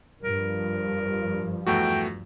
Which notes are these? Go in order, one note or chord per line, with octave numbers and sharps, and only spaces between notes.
G2 F3 A#4
E2 A3 F#4 G5